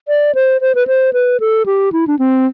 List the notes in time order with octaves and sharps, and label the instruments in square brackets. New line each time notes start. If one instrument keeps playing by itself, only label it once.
[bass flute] D5
C5
C5
B4
C5
B4
A4
G4
E4
D4
C4